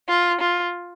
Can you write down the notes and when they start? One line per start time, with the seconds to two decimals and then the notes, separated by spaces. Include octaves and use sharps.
0.09 F4
0.41 F4